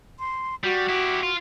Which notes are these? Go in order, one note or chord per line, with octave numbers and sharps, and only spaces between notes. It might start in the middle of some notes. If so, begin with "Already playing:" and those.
C6
G3 F#4
E4 G4
F4